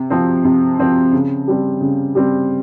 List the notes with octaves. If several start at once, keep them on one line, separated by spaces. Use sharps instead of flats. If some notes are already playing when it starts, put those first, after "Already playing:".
Already playing: C3
F3 C4
C3
F3 C4
C#3
G3 C4
C#3
G3 C4